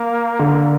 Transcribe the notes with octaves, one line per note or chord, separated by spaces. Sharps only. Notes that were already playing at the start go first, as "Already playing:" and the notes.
Already playing: A#3
D3